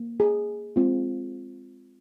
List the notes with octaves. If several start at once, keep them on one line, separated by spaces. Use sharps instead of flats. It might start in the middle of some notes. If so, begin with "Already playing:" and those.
Already playing: A#3
G#4
G#3 C4 F4